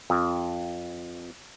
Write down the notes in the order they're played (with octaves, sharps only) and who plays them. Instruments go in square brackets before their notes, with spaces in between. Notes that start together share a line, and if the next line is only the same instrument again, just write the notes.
[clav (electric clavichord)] F2